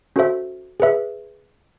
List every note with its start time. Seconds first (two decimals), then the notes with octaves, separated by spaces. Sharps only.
0.16 C#4 F#4 A4 C5 E5
0.80 G#4 B4 E5